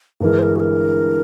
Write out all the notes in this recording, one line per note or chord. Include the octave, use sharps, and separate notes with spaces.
G1 G2 E3 G#3 A#4
C5
A#4
F#4
A#4